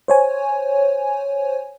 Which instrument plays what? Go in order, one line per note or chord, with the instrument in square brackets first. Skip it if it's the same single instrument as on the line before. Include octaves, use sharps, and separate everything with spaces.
[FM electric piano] C5 C#5 G#5